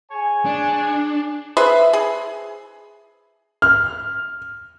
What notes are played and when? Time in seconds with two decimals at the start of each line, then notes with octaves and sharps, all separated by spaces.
0.11 G#4 C#5 G#5
0.46 D4
1.57 G#4 B4 C5 E5
1.93 G#4
3.62 F6